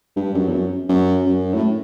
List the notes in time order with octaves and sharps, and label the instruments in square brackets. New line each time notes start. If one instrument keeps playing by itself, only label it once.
[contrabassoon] G2
F#2
E2
F#2
F#2
F#2
A2